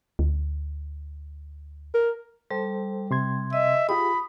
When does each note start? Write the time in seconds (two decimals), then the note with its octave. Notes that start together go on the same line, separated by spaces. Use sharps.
0.19 D2
1.94 A#4
2.51 G3 A4 C5
3.11 C3 C6 G#6
3.53 D#5 E5
3.89 F4 G4 G#4 B5 D#6